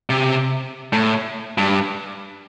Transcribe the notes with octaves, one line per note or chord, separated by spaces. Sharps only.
C3
A2
G2